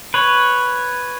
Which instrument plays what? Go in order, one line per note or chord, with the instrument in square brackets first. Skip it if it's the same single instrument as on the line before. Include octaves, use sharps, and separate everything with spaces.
[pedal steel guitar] B4 C#5